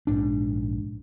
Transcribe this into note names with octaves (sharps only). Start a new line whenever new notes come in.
A#1 G#2 D4